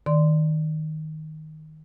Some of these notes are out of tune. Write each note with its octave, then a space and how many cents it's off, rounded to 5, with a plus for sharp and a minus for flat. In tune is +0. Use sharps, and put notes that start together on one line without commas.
D#3 +0 D5 +0 C6 -15